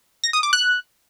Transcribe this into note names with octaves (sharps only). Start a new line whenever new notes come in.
A#6
D#6
D6
F#6